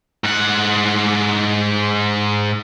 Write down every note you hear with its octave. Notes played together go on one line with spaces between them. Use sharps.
G#2 F#5